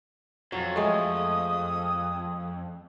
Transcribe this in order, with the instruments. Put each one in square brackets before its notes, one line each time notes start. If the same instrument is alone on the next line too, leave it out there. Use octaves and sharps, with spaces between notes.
[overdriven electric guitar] F2 [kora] F#3
[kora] G#3 A3 [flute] D#6